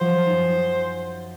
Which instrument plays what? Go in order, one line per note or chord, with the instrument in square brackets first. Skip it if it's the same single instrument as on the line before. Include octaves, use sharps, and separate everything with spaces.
[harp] F3 F#3 [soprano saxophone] C5
[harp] F#2 D#4